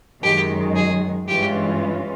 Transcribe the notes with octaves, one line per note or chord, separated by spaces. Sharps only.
F#2 D#3 G#3 G4
G#4
G2 E3 G#3 C#4 F4 G4